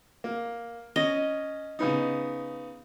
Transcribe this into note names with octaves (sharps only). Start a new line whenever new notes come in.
A#3
C#4 D#5
C#3 B3 D#4